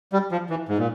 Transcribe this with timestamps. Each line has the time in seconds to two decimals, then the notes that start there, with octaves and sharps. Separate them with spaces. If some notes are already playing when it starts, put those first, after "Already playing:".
0.13 G3
0.32 F3
0.50 E3
0.69 G#2
0.78 A#2